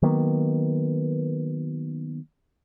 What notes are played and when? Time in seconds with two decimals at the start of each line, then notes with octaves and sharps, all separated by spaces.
0.02 D#3 F#3 A#3 B3